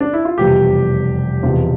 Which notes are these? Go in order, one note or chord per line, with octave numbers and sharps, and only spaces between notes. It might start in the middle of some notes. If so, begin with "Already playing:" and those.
D4
E4
F4
F1 E2 B2 G3 G4
E1 E2 C3 F3 F4